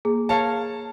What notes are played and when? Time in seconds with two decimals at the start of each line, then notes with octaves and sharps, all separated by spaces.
0.05 A#3 G#4
0.29 A#4 C#5 F5 A5